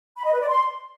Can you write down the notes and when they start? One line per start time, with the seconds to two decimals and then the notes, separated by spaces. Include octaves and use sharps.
0.17 B5
0.24 D#5
0.32 B4
0.40 D5
0.48 C6